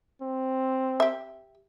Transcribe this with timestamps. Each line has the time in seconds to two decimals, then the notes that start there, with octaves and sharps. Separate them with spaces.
0.22 C4
1.00 G4 E5